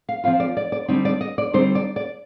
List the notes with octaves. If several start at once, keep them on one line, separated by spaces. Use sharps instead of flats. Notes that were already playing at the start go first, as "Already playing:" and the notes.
F5
F3 C4 F4 F5
D5
D5
D5
D3 G3 C4 D#4
D5
D#5
D5
D3 G3 C4 D#4 C5
D5
D5